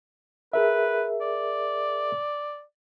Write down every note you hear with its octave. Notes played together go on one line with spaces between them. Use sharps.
G#4 A#4 B4 E5
D5